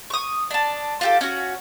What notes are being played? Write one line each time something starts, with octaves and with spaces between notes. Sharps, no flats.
C#6 D#6
D4 A5
F4 G4 A4
C#4 F#4